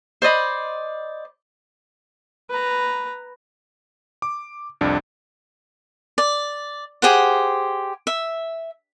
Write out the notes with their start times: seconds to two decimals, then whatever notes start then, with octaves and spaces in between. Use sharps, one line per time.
0.22 C5 D5 D#5 B5
2.50 B4 A#5
4.22 D6
4.81 C2 F2 D4
6.18 D5
7.02 G4 G#4 C5 F#5
8.07 E5